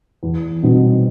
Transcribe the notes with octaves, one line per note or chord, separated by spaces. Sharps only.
E2
B2 G3 C4 D#4